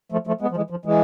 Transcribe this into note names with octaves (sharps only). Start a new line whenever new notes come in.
F3 A3
F3 A3
G#3 B3
F3
E3 G#3
F3
E3 G#3